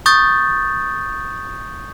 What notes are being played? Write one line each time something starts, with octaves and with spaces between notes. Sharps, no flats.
C#6 D#6 G6 A6